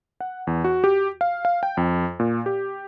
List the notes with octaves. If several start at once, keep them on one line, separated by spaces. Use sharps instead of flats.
F#5
E2
F#4
G4
F5
F5
G5
F2
A#2
G4